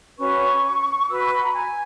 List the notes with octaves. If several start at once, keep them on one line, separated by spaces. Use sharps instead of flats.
C#4 F#4 B4 C#6
F#4 B4 E6
E6
C#6
A#5
G#5